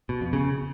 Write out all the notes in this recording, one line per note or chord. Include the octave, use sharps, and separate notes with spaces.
B2
F2
C#3